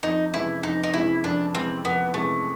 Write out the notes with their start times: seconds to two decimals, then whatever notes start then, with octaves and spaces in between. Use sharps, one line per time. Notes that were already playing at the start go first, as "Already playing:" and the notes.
0.03 F2 D#4
0.33 C3 E3 G#3 C#4 E4
0.63 F2 D#4
0.83 D#4
0.94 C3 E3 G#3 C#4 E4
1.24 F2 D4
1.54 C3 E3 G#3 C4 C#4
1.84 F2 B3
2.14 C3 E3 G#3 A3 C#4